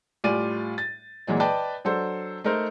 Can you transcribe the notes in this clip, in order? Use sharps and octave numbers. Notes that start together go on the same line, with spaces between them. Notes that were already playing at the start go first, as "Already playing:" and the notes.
A2 G3 F4 D5 G#5 D#7
A6
A#2 E3 F#3 G#3
B4 D5 D#5 G5 A5
F#3 D4 A4 C5
A3 D#4 A#4 C5